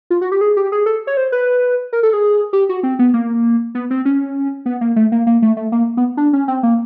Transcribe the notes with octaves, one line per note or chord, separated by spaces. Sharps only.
F4
F#4
G4
G#4
G4
G#4
A4
C#5
C5
B4
A#4
A4
G#4
G4
F#4
C4
B3
A#3
B3
C4
C#4
B3
A#3
A3
A#3
A#3
A3
A3
A#3
B3
D4
C#4
C4
A#3